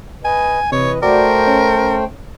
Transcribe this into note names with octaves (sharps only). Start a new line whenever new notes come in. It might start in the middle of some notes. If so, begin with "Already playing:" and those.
B4 D#5 G#5
C3 E3 B4 C#5 D#5
A3 F#4 A#4 C5 D5 G5
C#4